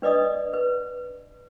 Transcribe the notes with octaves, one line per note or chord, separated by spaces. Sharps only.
D4 B4 D5 D#5 D#6
B4